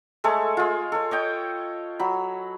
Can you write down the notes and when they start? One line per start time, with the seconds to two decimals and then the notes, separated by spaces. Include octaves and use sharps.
0.24 G#3 A3 A4 C#5
0.57 G#3 F4
0.92 A4 C#5
1.11 C#5 D#5 G5
1.99 F#3 B5